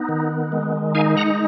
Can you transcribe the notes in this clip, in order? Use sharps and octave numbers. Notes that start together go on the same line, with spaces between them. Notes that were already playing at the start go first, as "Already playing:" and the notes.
Already playing: B3 D#4
D#3
G#3
D#4 F5 G#5
F#5 A#5